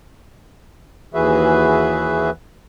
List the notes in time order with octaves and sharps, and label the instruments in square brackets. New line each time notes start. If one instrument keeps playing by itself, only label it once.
[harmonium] D#2 E3 F#4 G#4 B4 E5